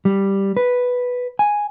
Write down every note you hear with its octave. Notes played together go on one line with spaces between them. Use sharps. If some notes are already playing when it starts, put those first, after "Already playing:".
G3
B4
G#5